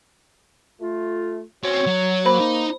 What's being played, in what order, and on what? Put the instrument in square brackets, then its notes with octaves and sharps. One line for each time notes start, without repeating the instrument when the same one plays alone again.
[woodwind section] A3 F4
[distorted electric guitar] C4 C#4 [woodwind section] F#4 C#5
[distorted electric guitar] F#3
[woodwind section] A#3 [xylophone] C5 B5
[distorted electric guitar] D#4